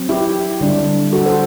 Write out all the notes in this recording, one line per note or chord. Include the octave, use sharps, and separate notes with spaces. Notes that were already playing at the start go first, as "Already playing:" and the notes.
Already playing: F#3 C4
E4 G4
D3 G3 D4
F#4 A4
A4 C5